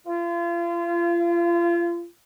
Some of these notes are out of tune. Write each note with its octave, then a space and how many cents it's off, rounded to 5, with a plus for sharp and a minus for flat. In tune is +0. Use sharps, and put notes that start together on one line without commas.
F4 -35